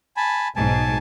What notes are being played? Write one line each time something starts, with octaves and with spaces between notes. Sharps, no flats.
G#5 A5 B5
B1 G#2 G#5 A5